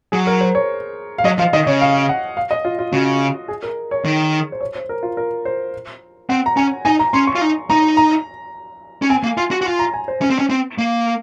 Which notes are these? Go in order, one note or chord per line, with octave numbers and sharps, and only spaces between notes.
F#3 G#4
A#4
C5
C#5
F5
F#3 D#5
F3 F5
D#3 D#5
C#3 C#5
F5
F#5
F5
D#5
F4
F4
C#3 F#4
G#4
A#4
C#5
D#3
C5
C#5
C5
A#4
F4
A#4
C5
C4 F#5
A#5
C#4 G#5
D#4 G#5
A#5
C#4 C6
C#6
F4
D#4
D#4 A#5
A#5
C#4
C4 G#5
A#3
F4 C6
F#4
F#4
F4 C6
A#5
G#5
C5
C#4
C4
C#4
C4
A#3